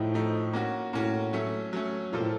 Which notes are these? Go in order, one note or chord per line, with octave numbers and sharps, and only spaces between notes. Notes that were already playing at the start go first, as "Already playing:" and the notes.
Already playing: A2 F3 A3 D#4
F3 A3 D#4
A#3 C#4 F#4
A2 A#3 C#4 F#4
F#3 A3 C#4
F#3 A3 C#4
A#2 F3 A#3 F4 A4
A2